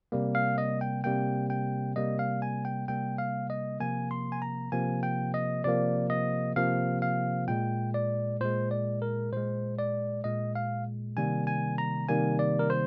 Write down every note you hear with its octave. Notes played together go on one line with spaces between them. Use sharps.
C3 G3 A#3
F5
D#5
G5
C3 G3 A#3 G5
G5
C3 G3 A#3 D#5
F5
G#5
G5
C3 G3 A#3 G5
F5
D#5
C3 F3 A#3 G#5
C6
G#5
A#5
C3 F3 A#3 G#5
G5
D#5
C3 F3 A#3 D5
D#5
C3 F3 A#3 F5
F5
A#2 G#3 G5
D5
A#2 G#3 C5
D5
A#4
A#2 G#3 C5
D5
A#2 G#3 D#5
F5
C3 D#3 G3 A#3 G#5
G#5
A#5
C3 D#3 G3 A#3 G#5
D5
A#4
C5